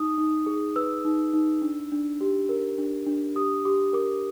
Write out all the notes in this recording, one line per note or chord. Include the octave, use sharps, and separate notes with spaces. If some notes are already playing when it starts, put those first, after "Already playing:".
Already playing: D#4 D#6
D#4
G#4
B4 E6
D#4
D#4
D4
D4
G4
A#4
D4
D4
G4 D#6
G4 D6
A#4 D6